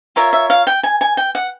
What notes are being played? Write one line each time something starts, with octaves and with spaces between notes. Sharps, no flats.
F4 A#4 C#5 E5
E5
F5
G5
G#5
G#5
G5
F#5